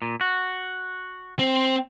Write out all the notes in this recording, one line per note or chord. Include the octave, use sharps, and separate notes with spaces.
A#2
F#4
C4